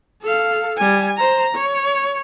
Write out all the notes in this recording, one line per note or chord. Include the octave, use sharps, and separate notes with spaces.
A4 F5
G3 G#5
C5 A#5
C#5